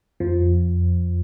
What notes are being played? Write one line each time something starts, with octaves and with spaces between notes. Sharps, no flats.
F2 F3